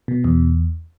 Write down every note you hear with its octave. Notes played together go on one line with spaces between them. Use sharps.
B2
E2